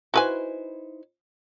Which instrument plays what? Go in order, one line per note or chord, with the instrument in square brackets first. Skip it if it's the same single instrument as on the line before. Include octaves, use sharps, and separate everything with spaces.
[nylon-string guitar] D#4 E4 C5 [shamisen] F#4 B4 G#5